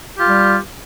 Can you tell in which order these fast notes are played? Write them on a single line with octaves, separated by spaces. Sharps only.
G4 F4 G3